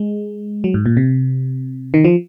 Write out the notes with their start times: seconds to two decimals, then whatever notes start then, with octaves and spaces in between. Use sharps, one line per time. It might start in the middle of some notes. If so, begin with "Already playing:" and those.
Already playing: G#3
0.64 F#3
0.74 G#2
0.86 A#2
0.97 C3
1.94 D#3
2.04 F3